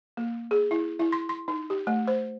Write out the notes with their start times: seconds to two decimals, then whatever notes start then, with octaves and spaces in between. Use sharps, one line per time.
0.17 A#3
0.51 G#4
0.71 E4
1.00 E4
1.12 C6
1.29 C6
1.48 D#4
1.70 G4
1.87 A3
2.08 C5